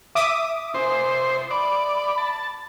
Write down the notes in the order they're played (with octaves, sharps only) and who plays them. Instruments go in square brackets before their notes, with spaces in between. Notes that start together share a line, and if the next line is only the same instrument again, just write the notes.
[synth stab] E5 D6 D#6
[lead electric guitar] F4 G#5 [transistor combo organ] C5
[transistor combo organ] D5 [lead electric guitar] B5
[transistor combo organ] A5